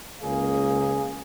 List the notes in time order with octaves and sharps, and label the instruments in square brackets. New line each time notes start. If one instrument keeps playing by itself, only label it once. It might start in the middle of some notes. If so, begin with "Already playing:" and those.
[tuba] C#2 [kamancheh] A#3 C#4 [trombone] G#4